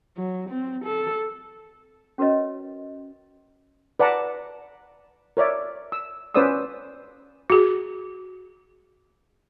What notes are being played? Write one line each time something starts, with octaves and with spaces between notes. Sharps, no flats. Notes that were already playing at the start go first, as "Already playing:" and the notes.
F#3
C4
A4
C#4 F#4 A#4 B4 C#5 D#5
B4 D5 F#5 A5 A#5
A#4 C#5 D5 E5
E6
C#4 B4 C5 D5 D#6 E6
F#4 G#4